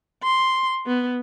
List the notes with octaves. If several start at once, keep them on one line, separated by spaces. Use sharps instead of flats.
C6
B3